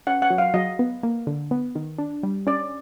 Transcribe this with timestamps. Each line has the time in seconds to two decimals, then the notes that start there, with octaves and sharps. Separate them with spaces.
0.07 C#4 F#5
0.22 F#5
0.30 F#3
0.38 F5
0.54 F#3 D#5
0.79 B3
1.03 A#3
1.27 D3
1.51 B3
1.75 D#3
1.98 D4
2.23 G3
2.47 C#4 D5